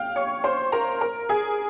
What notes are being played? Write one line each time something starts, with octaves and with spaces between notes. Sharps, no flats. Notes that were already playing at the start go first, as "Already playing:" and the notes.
Already playing: F5 G5 F6
C#5 C#6
C5 C6
A#4 A#5
A#4 A#5
G#4 G#5